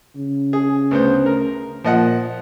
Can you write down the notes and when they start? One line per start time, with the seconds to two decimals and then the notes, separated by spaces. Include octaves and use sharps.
0.16 C#3
0.53 G#4
0.91 D2 B3 C5
1.26 A#4
1.84 A#2 F3 D#5 F#5